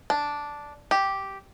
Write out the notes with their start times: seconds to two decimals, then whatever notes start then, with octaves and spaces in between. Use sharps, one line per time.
0.10 D4
0.91 G4